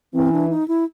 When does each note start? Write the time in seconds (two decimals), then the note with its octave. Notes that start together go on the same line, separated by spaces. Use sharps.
0.13 E3 C4
0.32 D4
0.50 D#4
0.68 E4